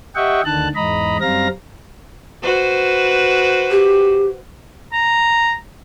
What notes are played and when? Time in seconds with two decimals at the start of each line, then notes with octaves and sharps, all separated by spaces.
0.16 G4 D#5 E5 F#5 G5 C#6
0.45 D2 D3 D#3 A5 F#6
0.75 E2 G#2 D#5 A#5 B5
1.21 F#2 G3 C4 F5 A#5 A#6
2.43 F#4 B4 C5
3.71 G4
4.93 A#5